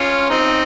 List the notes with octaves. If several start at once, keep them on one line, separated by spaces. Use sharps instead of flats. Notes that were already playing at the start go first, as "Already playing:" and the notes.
Already playing: C#4 F4
C4 D#4